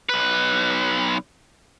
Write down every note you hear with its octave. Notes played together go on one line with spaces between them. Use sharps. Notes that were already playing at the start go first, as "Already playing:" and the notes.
B1 B4